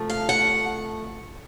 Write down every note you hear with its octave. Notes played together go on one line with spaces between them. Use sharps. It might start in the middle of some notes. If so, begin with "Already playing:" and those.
Already playing: C3 F3 A3
F5
F#5